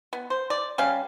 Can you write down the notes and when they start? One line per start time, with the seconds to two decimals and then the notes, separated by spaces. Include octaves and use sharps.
0.13 B3
0.30 C5
0.50 D5
0.78 G3 C#4 F5